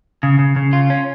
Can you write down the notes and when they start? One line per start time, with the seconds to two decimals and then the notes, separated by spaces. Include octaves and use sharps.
0.23 C#3
0.39 C#3
0.56 C#3
0.73 F4
0.90 C#4